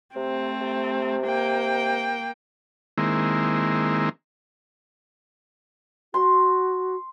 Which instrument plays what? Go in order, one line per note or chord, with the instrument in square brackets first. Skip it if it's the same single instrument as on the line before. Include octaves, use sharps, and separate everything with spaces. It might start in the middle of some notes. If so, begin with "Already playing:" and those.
[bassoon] C3 [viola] A3 C4
[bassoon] C3
[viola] A#3 G5
[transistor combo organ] D#3 G#3 A#3 C4 E4
[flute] F#4 [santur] C6